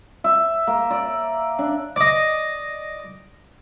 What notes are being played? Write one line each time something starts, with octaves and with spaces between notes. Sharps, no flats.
E5
A#3
D5
D4
D5 D#5